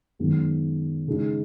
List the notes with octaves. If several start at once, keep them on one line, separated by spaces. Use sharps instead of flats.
F#2 D#3 G#3 B3
C#3 G#3 D#4